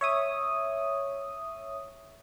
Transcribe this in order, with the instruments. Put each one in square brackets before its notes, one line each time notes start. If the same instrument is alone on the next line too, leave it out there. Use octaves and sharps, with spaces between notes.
[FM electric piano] C#5 E5 D#6